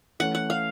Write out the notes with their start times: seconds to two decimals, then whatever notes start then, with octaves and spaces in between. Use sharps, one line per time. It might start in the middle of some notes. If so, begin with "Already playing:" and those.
0.20 E3 A3 C#4 F#5
0.35 F#5
0.50 F5